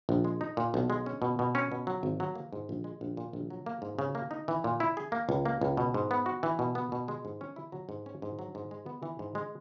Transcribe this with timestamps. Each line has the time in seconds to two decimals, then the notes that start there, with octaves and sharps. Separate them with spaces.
0.09 A#1
0.24 G#3
0.41 D#4
0.57 A#2
0.74 B1
0.90 G#3
1.06 C#4
1.22 B2
1.39 B2
1.55 C#4
1.72 B2
1.87 F#3
2.03 G#1
2.20 F#3
2.35 A#3
2.53 G#2
2.69 A#1
2.84 G#3
3.01 A#1
3.17 A#2
3.33 A#1
3.50 F#3
3.66 A#3
3.82 G#2
3.99 C#3
4.15 A#3
4.31 D#4
4.48 E3
4.64 A#2
4.80 E4
4.97 G#4
5.12 A#3
5.29 C#2
5.45 A#3
5.61 C#2
5.77 B2
5.94 G#2
6.11 B3
6.26 F#4
6.43 E3
6.59 B2
6.75 B3
6.92 B2
7.08 G#3
7.25 G#2
7.41 C#4
7.56 E4
7.72 F#3
7.89 G#2
8.06 C#4
8.22 G#2
8.39 F#3
8.55 G#2
8.71 G#3
8.86 B3
9.03 E3
9.19 G#2
9.35 G#3